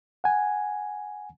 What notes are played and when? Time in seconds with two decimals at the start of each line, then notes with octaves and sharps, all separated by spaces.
0.24 F#5 G#5